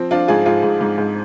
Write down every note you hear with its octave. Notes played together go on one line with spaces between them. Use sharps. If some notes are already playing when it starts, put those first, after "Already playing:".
Already playing: F3 C4
F3 D4 F4
G#2 F4 G#4
G#2 F4 G#4
G#2
G#2
G#2